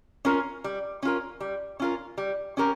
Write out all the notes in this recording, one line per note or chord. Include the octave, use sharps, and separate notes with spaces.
C#4 F4 A#4
G3
C#4 F4 A#4
G3
C#4 F4 A#4
G3
C#4 G4 A#4